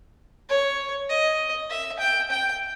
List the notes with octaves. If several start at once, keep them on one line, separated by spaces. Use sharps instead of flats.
C#5
D#5
E5
G5
G5